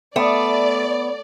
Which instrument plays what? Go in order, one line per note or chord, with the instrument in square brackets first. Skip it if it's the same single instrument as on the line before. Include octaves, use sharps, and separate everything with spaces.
[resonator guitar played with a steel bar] A3 [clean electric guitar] B3 [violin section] D5